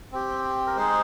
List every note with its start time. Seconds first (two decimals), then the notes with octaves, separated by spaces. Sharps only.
0.12 C4 G4
0.66 A#4
0.76 G#3 D#4 G#4 C5